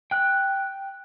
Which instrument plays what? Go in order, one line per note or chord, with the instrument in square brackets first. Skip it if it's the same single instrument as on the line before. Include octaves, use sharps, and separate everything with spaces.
[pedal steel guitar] G5 F#6